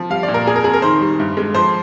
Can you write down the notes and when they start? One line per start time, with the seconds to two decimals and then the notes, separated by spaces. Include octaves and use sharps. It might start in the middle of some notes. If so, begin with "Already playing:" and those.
Already playing: F3
0.10 G3 F5
0.23 D5
0.28 A#2
0.34 A#4
0.46 F2 G#4
0.56 A#4
0.64 F2 G#4
0.74 A#4
0.82 D#3 C5
1.01 G3
1.20 G2
1.37 G#3
1.55 F3 C5